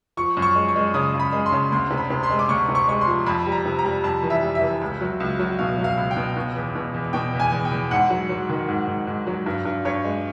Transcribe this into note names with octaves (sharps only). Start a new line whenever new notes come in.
F3 C#6
F#2
C#6
G#3
C#6
G#3
C#3 D#6
C#3
B5
G#3
C6
C#3
D2 C6
C3
B5
C3
C6
G#3
D6
D2 C#6
C3
C#6
G#3 C#6
C6
F3
F2 B5
G3
A#5
C3
A#5
G3
F2 A5
E3
E5
G3
E5
E3
C#2
F#3
C#2
F#3
B2 F5
F#3
F5
C#2
G5
B2
B2
E2
B2
E2
B2 G5
E2
G#5
E2
G5
E2
G#2 F#5
F#3
F#3
D#3
G#2
G#2
G#2
F#3
G2
G2
G2 C#5
G#3